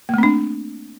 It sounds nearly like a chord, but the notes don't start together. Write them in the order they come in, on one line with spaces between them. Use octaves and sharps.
A#3 A3 C4 D4